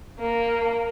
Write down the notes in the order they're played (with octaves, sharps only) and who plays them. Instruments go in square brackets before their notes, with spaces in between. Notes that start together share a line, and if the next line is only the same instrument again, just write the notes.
[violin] A#3